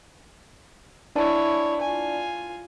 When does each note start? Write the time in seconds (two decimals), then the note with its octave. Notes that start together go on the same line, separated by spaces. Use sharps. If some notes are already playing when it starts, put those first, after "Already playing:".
1.15 D4 E4 C#5 D5 A5
1.81 F4 G#5